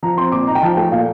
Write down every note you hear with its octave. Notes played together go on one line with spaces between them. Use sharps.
F3 A#5
C4 C6
A#2 D6
D#4 A#5
G5
F3 A5
A3 G5
A#2 F5